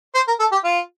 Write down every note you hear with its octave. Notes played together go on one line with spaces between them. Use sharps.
C5
A#4
A4
G4
F4